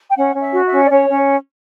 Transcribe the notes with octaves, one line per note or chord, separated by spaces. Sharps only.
G5
C#4 F#5
C#4
E5
F#4
E5
C#4
D5
C#4 C#5
C#4